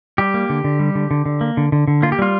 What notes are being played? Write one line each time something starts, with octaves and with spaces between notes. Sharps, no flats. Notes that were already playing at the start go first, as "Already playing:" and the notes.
G3 G4
A#3
D3
D3
G3
D3
D3
D3
A#3
D3
D3
D3
A#3 F4
G4
G3 F4